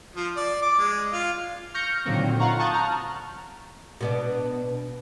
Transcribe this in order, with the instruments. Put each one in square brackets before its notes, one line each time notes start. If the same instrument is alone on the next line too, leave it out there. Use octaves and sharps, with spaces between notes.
[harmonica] F3
D5
D6
G#3
F4
[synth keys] C#6 F6 G6 A#6 C#7
A#2 D3 D#3 F#3 A#3 C4
F4 F5 F#5 A#5 C#6
A5 C#6 D#6 F#6 G6 A6
A#5 F6
[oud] B2 B3 D4